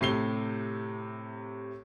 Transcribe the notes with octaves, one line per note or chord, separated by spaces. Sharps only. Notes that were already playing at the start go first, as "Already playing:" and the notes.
A2 C3 C7 G7